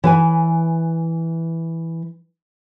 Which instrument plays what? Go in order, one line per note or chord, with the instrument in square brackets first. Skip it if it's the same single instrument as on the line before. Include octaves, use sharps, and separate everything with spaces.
[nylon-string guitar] E3 B4 G#5